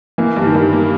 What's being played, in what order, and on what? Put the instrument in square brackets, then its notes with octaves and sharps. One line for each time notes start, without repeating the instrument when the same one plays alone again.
[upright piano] E3 [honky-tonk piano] A#3
[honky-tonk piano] G2
[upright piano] D#3
[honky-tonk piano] G2
A#3